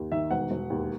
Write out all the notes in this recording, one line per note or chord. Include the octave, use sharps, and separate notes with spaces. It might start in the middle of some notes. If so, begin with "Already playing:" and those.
Already playing: D#2
D#3 E5
E1 F#5
E1
D#2